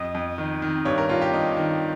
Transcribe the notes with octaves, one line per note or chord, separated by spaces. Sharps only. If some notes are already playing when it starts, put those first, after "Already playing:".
Already playing: F2 D#5
F2
D#3
D#3
G2 C#5
A#4
G2 F4
G4
D#3 D#4
D#3